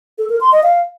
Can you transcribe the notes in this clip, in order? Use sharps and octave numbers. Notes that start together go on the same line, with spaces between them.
A4
A#4
C6
D#5
F5